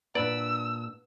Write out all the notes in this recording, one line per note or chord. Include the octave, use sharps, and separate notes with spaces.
A#2 D4 B4 D5 E6